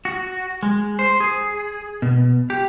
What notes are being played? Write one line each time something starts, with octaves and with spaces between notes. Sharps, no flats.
F#4
G#3
C5
G#4
B2
G4